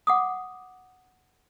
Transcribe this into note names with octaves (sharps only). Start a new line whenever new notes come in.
F#5 D6 D#6